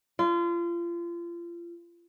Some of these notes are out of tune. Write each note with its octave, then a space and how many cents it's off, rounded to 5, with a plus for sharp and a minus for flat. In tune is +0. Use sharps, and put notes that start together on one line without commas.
F4 -30